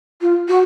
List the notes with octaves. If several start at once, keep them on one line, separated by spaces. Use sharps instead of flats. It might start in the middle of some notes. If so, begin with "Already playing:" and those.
F4
F#4